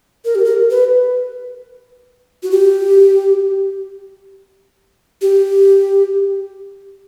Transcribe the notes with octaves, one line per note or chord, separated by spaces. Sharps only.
A#4
G4
A#4
B4
F#4
G4
G4